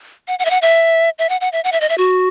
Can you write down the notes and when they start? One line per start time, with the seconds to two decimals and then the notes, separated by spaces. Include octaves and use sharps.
0.28 F#5
0.39 F#5
0.45 E5
0.51 F#5
0.62 E5
1.19 E5
1.29 F#5
1.41 F#5
1.53 E5
1.64 F#5
1.72 E5
1.81 D#5
1.89 E5
1.98 F#4